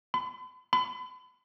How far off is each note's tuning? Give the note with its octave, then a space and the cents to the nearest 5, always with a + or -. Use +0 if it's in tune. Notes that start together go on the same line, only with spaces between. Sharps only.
B5 +45
B5 +40